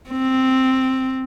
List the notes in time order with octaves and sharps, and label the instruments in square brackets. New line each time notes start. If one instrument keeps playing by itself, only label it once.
[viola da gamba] C4